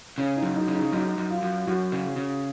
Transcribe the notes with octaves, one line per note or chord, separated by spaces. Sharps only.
C#3 C#4
D#4
F#2
D#4
C#3
D#4
F#2 D#4
F#2
F4
F#2
F#2 F#4
C#3
C#3